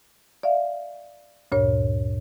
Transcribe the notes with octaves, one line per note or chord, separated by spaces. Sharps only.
D5 E5 F5
D2 G2 A#2 C#5